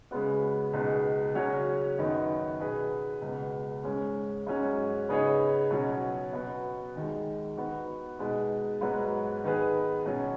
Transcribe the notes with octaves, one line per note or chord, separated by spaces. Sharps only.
C#3 G#3 B3 F#4
C#2 B2 G#3 D#4 B4
C#3 F#3 C#4 F#4 C#5
F#2 D#3 B3 D#4 F#4
B2 B3 G#4 B4
C#2 B2 B3
G#2 G#3 C#4
G#2 F#3 C#4
C#3 B3 D#4 G#4 C#5
B2 F#3 C#4 F#4
B2 B3 F#4 B4
D#2 D#3 G#3
D#3 B3 F#4
B2 G#3 D#4 B4
G#2 F#3 B3 F#4 B4
D#3 B3 G#4 B4
B2 F#3 C#4